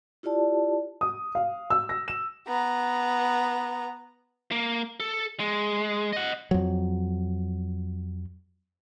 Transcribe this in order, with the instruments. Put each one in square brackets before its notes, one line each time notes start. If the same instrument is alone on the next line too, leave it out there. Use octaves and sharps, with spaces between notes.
[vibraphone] E4 F4 G4 D5 A5
[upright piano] D#6
F5
E6
A#6
E7
[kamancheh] B3 A#5
[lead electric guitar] A#3
A4
G#3
D#5 F#5
[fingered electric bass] F2 F#3